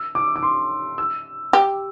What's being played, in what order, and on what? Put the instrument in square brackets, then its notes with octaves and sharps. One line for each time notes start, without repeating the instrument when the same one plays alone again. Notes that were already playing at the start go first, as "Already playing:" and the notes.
Already playing: [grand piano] E6
D6
D6
C6
E6
[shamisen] G4